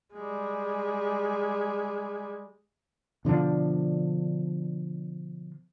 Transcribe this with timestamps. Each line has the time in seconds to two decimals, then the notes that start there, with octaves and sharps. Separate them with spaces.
0.14 G3 G#3
3.25 B2 D3 F3 D4